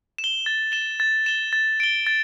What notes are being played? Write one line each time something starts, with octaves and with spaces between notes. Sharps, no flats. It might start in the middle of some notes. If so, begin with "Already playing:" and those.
E7
G7
A6
E7 G7
A6
E7 G7
A6
D7 G7
A6